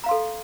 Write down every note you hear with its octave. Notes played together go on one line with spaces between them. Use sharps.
A4 F5 A#5 C6